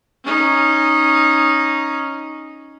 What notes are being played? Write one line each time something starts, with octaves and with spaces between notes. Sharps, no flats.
C#4 D#4